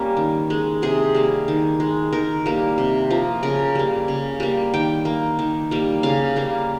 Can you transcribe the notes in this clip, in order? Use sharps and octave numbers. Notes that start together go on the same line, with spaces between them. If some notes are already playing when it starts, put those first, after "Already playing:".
Already playing: G3 A#3 C#4
D#3
G#3
C3 G#4
G3 A#3
D#3
G#3
D#3 A#4
G3 A#3
C3
F3 A#3
C#3 A#4
G3 A#3
C#3
G3 A#3
D#3 G5
A#3
D#3
G3 A#3
C#3 F5
G3 A#3